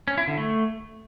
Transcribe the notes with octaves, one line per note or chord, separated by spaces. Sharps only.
C#4
E4
D3
A3